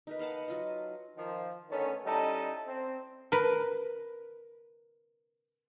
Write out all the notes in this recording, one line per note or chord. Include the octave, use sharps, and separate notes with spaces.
D#4 A#4 B4
D#5 F5 F#5 A5
B5
F#3 F4 D#5
D#3 F3
D3 D#3 A3 B3 C#4
G3 C#4 D#4 E4 A4 D#5
C4
A#4 B4